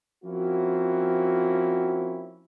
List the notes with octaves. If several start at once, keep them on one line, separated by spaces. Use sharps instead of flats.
F3 A#3 C4 C#4 E4 F#4